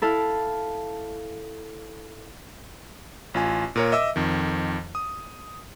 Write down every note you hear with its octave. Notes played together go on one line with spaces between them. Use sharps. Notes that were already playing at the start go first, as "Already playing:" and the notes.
E4 A4 F5
A1 F4 G#5
A#2 A#4 C#5
D#5 E5 D6 E6
F2 D#3
D#6